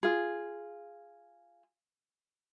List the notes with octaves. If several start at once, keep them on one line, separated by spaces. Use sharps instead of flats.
F4 G#4